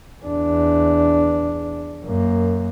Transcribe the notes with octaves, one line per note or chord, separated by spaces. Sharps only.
E2 D4
F#2 A#3